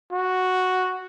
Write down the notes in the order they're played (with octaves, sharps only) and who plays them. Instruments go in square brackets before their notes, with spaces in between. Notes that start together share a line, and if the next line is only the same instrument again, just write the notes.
[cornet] F#4